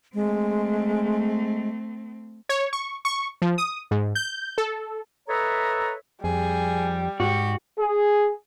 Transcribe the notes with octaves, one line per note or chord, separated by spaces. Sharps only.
G#3 A3 C4
C#5
C#6
C#6
F3
D#6
G#2
G6
A4
A4 B4 C#5 D#5 E5 A#5
F2 G3 G#4
G#2 F#4 G4
G#4